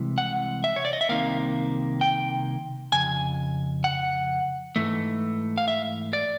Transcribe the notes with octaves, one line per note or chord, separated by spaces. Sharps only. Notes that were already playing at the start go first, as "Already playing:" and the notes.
Already playing: C2 C3 E3 G#3
F#5
E5
C#5
D5
D#5
E5
C2 C3 D#3 A#3 F5
G5
F2 C#3 G#5
F#5
G#2 E3 A3
F5
E5
D5